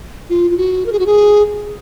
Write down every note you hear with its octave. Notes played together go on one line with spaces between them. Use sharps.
F4
F4
F#4
A#4
G#4
F#4
G#4